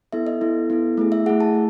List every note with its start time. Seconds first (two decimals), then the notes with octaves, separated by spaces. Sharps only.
0.13 B3 E4 A4 E5
0.27 D#5
0.41 B3 E4 A4
0.70 B3 E4 A4
0.98 A3 E4 G#4
1.12 E5
1.26 A3 E4 G#4 F#5
1.40 A5
1.55 A3